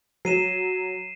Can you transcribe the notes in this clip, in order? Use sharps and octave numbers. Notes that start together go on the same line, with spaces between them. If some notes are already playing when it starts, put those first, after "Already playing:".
F#3 C7 D#7 E7